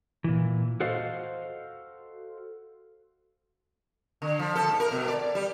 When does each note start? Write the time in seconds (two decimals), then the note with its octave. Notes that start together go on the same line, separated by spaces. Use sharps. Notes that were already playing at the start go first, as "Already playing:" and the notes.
0.24 A#2 E3
0.80 F#4 A4 C5 D#5 F5
4.22 D3
4.39 F3
4.55 A4
4.68 G#2
4.80 A#4
4.91 B2
5.08 D5
5.35 G3